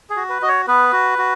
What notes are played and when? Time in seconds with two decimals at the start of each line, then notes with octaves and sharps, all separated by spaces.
0.10 G#4
0.17 F#4
0.29 B4
0.42 F#4 D#5
0.48 C#5
0.67 B3 B4
0.93 F#4
1.18 F#4